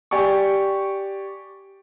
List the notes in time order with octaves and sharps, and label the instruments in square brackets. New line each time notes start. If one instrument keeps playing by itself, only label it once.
[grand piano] G4 D5 G#5 C#6